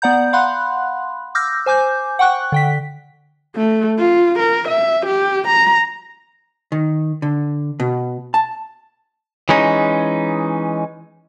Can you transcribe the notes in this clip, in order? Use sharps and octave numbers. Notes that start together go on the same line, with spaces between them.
B3 D5 F#5 A#5 G6
F5 F#5 B5 C6 F#6
D6 E6 F6 G6 A#6
C5 G#5 D6 G6
F#5 G5 C#6 F#6
D3 G5 B6
A3
F4
A#4
E5
G4
A#5
D#3
D3
B2
A5
E3 G#3 C#4 D#4